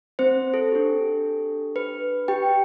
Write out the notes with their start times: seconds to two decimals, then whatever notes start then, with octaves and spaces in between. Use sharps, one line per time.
0.19 C4 C5
0.54 A4
0.72 D4 G4
1.76 B4
2.28 G4 G5